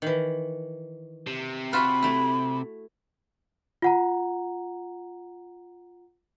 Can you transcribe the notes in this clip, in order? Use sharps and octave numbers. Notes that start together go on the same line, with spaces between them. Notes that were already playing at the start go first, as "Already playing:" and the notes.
D#3 E3
C3
F4 F#4 E5 B5
A3 E4
F4 F#5 A#5